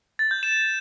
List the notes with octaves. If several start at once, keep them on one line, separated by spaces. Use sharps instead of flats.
A6
G6
E7